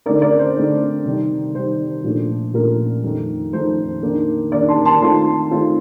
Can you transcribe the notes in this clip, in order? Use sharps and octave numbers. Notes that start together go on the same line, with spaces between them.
D3 A3 C4 D#4 A#4 D5
A#4 D5
C5
D3 A3 C4 D#4
C3 D#3 G3
C3 D#3 G3 C5
A#2 F3 A3 D4
A#2 F3 A3 D4 A#4
F2 D#3 A3 D#4
F2 D#3 A3 D#4 C5
D#3 A#3 D4
D#3 A#3 D4 A#4 D5
A5 C6
A5 C6
D#3 A3 C4 F4 A5 C6
D#3 A3 C4 F4